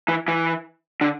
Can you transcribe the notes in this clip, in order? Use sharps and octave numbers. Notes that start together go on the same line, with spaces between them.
E3
E3
D3